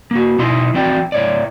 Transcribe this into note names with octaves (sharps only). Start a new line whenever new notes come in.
A#3 F#4
B2 D#4 E4 D#5 C6
A2 E3 C4 F#4 D5 G5
A2 C#5 D5